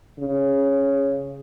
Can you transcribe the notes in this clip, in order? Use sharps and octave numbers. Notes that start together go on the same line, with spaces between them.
C#3